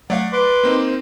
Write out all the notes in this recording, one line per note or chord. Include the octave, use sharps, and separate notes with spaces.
F#3 A3 D5 F5 F#5
B4 C6 D6
A#3 C4 D#4
C5